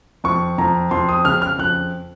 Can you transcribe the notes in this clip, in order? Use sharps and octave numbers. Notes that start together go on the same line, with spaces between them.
F2 C#6
F2 A#5
F2 C6
D#6
C#3 F6
F6
F2 F#6